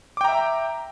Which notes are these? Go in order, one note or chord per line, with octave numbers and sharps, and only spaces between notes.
E5 G5 A#5 D6